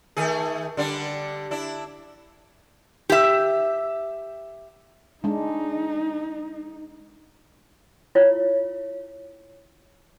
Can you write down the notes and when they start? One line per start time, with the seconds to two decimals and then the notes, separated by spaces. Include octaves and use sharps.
0.17 D#3 A3 G#4
0.77 D3 G3 D4
1.51 D4 E4
3.10 G4 E5
5.24 G#3 D4 D#4
8.15 E4 F4 C#5